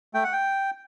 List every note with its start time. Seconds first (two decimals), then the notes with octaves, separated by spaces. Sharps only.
0.14 A3 G5
0.24 F#5
0.33 G5